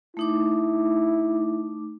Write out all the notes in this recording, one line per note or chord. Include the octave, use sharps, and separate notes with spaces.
A3 D#4 E4 D6